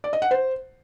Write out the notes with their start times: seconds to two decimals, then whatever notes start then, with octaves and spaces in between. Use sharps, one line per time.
0.04 D5
0.13 D#5
0.22 F#5
0.31 C5